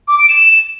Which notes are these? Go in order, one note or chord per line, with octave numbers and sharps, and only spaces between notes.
D6
D7
E7